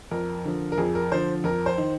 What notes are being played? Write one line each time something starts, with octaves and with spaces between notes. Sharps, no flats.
F2 A#4
D3 F3
A#4
F2 G#4
A#4
D3 F3 C5
F2 A#4
C5
D#3